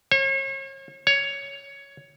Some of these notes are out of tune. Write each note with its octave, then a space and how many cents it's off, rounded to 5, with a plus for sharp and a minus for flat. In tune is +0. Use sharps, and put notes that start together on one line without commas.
C#5 -40
C#5 +10